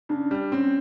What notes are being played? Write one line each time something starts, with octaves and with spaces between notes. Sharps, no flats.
C#3 D4
G3
C4 C#4